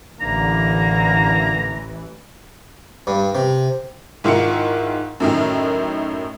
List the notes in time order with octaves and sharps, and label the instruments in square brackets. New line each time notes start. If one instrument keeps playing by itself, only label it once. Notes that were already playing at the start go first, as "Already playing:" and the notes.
[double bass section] A1 E3 [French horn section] D3 [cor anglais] A#3 [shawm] A#5
[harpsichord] G2
C3
[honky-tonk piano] G#2 D#3 E4 F4 A#4 C#7
F#2 A2 D#3